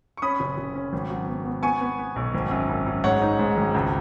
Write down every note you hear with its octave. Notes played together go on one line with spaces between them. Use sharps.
C#6
C#4 B5 D#6
F#1
F#1
C#4
G#1
F#3
B3
B3
B3 G#5 C#6
B3
B3
B1
G#1
F#2
F#2
F#2
G#2 C#5 F#5
D#4
G#2
G#1
C#2